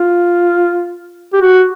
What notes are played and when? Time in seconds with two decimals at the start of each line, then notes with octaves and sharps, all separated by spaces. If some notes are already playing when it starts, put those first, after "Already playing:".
Already playing: F4
1.34 G4
1.41 F#4